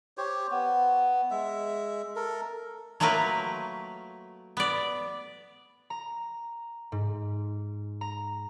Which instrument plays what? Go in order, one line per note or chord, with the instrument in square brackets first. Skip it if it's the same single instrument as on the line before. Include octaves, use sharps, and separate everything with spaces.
[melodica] G4 C5 C#5
B3
G#3 E5
A4 A#4
[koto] F#3 A3 A#3 F4 A#4 B4
B3 D5
[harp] A#5
G#2
A#5